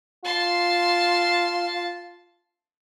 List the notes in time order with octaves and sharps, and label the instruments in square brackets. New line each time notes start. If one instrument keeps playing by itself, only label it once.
[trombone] F4 [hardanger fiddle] A5 C6